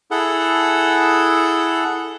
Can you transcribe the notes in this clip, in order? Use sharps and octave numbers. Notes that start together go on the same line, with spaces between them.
E4 G#4 A4 F#5